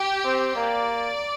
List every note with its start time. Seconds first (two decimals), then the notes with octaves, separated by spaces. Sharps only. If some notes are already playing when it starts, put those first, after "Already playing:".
Already playing: G4
0.25 C4
0.56 A#3 D5